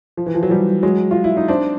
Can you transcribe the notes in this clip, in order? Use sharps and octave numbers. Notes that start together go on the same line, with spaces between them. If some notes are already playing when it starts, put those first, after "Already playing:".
F3
E3
F3
E3 F#3
F3 G3
F#3 G#3
F4
E4
D#4
C4 D4